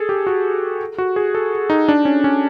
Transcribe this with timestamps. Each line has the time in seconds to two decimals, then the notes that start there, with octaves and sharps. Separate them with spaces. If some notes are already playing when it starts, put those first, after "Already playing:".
Already playing: G#4 A4
0.09 G4
0.27 F#4
0.98 F#4
1.16 G#4
1.35 A4
1.70 D#4
1.88 D4
2.05 C#4
2.24 C#4